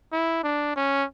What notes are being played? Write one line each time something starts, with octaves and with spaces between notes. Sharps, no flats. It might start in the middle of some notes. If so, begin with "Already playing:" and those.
E4
D4
C#4